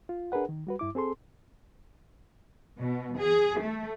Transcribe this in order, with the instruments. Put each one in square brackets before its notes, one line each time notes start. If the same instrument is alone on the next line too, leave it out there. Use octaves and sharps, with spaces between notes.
[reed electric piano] F4
D4 G#4 A#4 B4 F#5
D#3
G3 F#4 B4
G2 E4 D6
C4 G#4 A4 C6
[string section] B2
G#4
A3